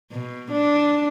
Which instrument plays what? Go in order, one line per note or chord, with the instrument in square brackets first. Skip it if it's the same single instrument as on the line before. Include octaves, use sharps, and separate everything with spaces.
[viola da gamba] B2
D4